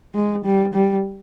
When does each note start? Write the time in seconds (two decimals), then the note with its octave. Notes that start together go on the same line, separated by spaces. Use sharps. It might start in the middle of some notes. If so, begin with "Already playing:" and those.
0.15 G#3
0.45 G3
0.74 G3